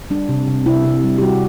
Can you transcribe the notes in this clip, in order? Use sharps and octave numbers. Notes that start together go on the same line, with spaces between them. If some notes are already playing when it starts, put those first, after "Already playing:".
G3 D4
C3
C3
C3 E4
C3
G3
G4
G3 F#4